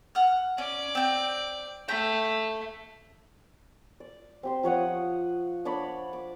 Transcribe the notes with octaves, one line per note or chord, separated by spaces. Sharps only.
F#5 F6
C#4 D5
C4 G5
A3 G5
D5
C4 G4 C6
F3 C#5 F#5 D#6
D4 C#5 D5 B5
D6